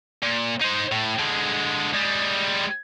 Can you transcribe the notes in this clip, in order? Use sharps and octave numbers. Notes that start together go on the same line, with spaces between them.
A#2
D#4 C5
A2
D3 G#3
G3 G#3